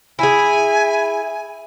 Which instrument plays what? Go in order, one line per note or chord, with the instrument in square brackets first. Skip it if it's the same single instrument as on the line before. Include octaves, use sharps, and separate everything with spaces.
[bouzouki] E4 G#4 [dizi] G#5